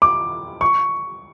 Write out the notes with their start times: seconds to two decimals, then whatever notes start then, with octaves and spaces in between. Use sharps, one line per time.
0.02 D6
0.61 C#6